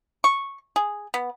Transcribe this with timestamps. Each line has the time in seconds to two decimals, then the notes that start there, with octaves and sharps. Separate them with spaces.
0.24 C#6
0.76 G#4
1.14 B3